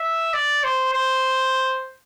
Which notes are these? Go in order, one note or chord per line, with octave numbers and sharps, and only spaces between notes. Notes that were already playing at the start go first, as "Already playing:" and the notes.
Already playing: E5
D5
C5
C5